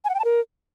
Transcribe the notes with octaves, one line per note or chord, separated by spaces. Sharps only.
G#5
F#5
G5
A5
A#4